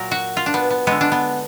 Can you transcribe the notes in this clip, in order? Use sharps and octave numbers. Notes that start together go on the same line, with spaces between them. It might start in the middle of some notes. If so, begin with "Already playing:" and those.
Already playing: A#2 F#3 A#4
F#4
F4
D4
B3
B3
D3 G#3 B3
D4
B3